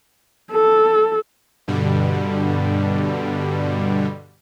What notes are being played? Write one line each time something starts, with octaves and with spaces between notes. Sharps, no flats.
A4
G2 B2 D3 G3